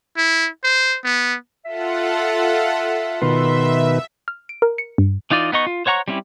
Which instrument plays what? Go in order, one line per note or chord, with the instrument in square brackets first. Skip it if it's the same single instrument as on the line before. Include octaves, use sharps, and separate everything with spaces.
[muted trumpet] E4
C5
B3
[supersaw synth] F4 A4 F#5 [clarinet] E5
[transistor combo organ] B2 D#3 B4 [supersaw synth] E5 [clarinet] C6
[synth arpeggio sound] F6
D7
A#4
C#7
G2
[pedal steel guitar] E3 D#4 F4 D5 D#5
B3 D#4 D#5 C#6
F4
C5 C#5 F#5 A#5 C#6
G3 C4 C#4 E4 G4